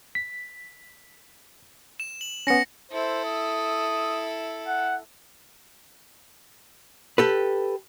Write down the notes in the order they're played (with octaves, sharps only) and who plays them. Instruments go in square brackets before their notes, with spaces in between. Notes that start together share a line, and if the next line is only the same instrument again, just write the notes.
[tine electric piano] B6
[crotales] E7
F#7
[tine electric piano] B3 C#4 [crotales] A#6 C#7
[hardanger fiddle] E4 A4 [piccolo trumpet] C5
[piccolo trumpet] D#6
F#5
[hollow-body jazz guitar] G4 A4 B4